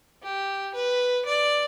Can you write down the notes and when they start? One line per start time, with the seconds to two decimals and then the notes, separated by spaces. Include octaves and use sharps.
0.23 G4
0.74 B4
1.25 D5